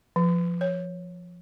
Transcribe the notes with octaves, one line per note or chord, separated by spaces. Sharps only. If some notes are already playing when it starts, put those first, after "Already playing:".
F3
C#5